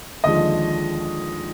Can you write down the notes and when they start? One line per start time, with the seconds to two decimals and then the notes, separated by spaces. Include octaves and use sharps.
0.24 D#2 D3 F3 G#3 D#5 D#6